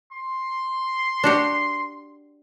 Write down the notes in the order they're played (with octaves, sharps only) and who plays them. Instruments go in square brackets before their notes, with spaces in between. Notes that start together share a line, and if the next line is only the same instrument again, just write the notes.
[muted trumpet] C6
[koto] D4 F#4 G4